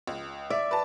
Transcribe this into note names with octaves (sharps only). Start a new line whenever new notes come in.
C#2
D5 E5
B4 A5